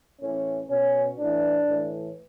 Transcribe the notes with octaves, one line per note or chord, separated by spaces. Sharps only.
A2 E3 C#4
B2 C#4
A2 E3 D4
A2 E3